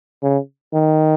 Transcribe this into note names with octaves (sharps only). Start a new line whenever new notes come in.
C#3
D#3